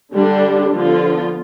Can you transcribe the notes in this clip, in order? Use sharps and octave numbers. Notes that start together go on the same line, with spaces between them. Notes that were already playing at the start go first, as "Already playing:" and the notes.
D3 G3 D4
D3 F3 B3 F4